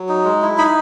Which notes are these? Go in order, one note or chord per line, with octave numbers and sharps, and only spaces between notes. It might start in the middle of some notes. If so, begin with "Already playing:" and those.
Already playing: F#3
D#4
G#3
E4
D#4 B5